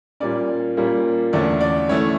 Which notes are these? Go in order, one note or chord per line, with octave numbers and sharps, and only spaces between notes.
A#2 G3 A#3 C#4 D5
A#2 G3 A#3 C#4
E2 D3 A3 C#4 D5
D5
E3 A3 C#4 C#5